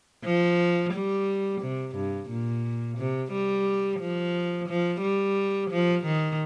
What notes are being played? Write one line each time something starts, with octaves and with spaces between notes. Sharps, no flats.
F3
G3
C3
G2
A#2
C3
G3
F3
F3
G3
F3
D#3